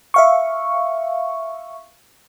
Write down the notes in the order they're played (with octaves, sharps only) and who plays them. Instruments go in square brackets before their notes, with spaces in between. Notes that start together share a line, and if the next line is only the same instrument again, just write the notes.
[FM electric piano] E5 F5 C#6